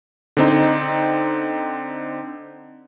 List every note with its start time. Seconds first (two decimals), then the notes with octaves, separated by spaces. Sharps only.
0.37 D3 C4 D#4